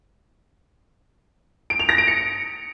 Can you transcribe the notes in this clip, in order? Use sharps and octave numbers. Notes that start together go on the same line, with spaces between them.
D7
F7
A#6
D7
C#7